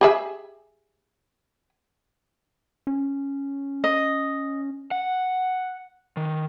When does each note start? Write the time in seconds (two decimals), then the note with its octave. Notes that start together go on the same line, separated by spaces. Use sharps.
0.01 G4 G#4 E5
2.87 C#4
3.84 D#5
4.91 F#5
6.17 D#3